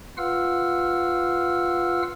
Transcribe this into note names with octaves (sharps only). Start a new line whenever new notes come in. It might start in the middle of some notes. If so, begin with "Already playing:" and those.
F4 B4 F5 F#5 E6 F6